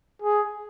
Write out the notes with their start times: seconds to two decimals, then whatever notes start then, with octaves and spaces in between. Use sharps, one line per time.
0.22 G#4